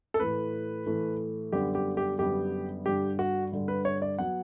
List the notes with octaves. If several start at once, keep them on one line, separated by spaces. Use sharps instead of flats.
A4
A2 E3 A3 B4
A2 E3 A3
F#2 D3 G3 B3 G4
G4
G4
F#2 D3 G3 B3 G4
G2 D3 G3 G4
F#4
G2 D3 G3
B4
C#5
D5
F#3 B3 F#5